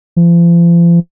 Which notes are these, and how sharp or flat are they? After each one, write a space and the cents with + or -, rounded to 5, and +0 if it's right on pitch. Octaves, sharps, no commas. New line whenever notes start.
F3 -40